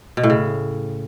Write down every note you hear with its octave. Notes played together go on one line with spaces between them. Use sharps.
B2
A2
C#3